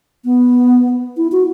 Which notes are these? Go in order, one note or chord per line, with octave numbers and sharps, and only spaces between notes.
B3
E4
F#4